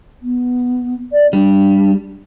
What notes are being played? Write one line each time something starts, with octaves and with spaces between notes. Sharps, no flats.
B3
D5
G3 D4